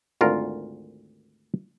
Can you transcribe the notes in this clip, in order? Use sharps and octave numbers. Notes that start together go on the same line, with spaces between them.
G#1 D2 F4 A#4